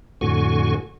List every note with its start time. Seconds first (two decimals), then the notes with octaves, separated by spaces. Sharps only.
0.21 F2 A2 D3 F#4 G#5 C#6